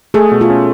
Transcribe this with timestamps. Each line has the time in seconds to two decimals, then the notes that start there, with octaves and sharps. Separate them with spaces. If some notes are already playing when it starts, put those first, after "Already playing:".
0.14 A3 G#4
0.32 B2
0.41 F4
0.50 C#4